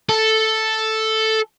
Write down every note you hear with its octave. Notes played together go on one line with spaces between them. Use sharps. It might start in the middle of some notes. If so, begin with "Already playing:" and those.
A4